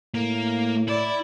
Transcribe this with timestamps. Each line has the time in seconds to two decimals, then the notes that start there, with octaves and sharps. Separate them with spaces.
0.14 A2 A#3
0.88 E4 D5